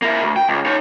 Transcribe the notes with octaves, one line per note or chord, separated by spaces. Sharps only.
A#3 E4
D2
G5
C#2
D#4 C#5